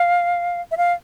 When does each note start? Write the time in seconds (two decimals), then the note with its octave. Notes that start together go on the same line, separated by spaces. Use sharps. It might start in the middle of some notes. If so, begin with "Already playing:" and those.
Already playing: F5
0.71 E5
0.77 F5